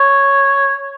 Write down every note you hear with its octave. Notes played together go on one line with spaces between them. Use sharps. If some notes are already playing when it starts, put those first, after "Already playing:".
Already playing: C#5